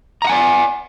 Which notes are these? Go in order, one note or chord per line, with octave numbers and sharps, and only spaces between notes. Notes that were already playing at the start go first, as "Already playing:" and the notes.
D5 E5 F#5 G#5 A#5